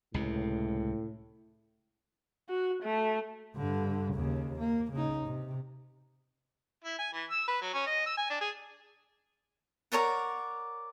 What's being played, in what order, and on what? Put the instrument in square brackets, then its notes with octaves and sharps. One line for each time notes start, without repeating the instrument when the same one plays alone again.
[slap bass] C#2 C3 [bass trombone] A2
[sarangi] F#4
A3
[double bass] G2 D3
D#2 C#3
A#3
C#3 D#4
C3
[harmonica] E4
G#5
E3
E6
B4
F#3
C#4
D#5
E6
G#5
D4
G#4
[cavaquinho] A#4 C#5 D5 F#5